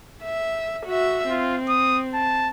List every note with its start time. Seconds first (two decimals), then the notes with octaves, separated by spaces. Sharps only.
0.23 E5
0.86 F#4 E5
1.30 C4 F4
1.68 D#6
2.14 A5